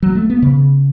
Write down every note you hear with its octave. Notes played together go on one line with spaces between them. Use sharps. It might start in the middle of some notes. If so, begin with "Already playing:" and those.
F#3
A3
B3
C#3